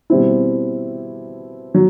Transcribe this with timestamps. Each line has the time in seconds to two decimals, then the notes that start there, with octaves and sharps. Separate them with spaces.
0.10 B2 G3 C4 E4
1.75 F#3